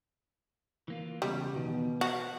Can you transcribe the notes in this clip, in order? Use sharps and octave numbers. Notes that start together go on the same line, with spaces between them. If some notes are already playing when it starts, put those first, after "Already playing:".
E3 A#3 F4
E2 C#3 G3 G#3
E2 B2 D#3
F#4 C5 E5 A5